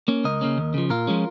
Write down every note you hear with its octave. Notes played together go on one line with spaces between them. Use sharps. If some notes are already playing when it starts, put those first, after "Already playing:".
A#3 C#4
C#2 A#4 D#5
C#3 A#3 C#4
D#2
C#3 F3
A#2 F4 A#4
F3 G#3 C#4